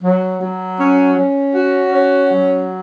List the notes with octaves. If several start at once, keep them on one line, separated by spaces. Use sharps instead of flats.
F#3
F#3
C#4
C#4
F#4
C#4
F#3